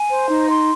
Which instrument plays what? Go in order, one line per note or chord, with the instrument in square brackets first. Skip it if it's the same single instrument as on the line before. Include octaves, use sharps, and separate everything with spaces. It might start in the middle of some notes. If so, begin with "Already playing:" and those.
Already playing: [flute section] G#5
C5
D#4
C6